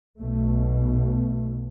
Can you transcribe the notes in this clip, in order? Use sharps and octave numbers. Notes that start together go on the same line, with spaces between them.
B1 B2 A3
A3